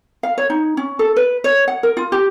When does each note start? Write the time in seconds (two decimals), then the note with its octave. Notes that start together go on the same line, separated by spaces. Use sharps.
0.23 F5
0.38 C#5
0.50 D#4
0.77 C#4
0.99 A4
1.16 B4
1.44 C#5
1.68 F#5
1.83 A#4
1.97 F4
2.12 G4